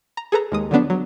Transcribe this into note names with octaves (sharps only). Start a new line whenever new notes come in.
A#5
G#4 A4 B4 A#5
D#2 G#3 D#6
D3 F3 F#3 B3 D4
F#3